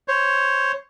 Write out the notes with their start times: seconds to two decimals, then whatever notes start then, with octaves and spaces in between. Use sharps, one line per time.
0.08 C5 C#5